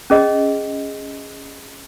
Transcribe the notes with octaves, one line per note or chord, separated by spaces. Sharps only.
C#4 G#4 D#5